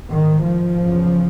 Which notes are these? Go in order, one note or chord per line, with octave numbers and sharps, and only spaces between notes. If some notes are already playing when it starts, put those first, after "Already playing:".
G#2 D#3
F3
E2 C#3